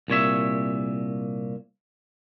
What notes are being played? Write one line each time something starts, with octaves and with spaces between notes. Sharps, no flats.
C2 A#2 C#5 E5